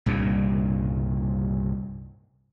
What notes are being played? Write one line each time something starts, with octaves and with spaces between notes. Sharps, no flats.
C2 G2 A#2 C#3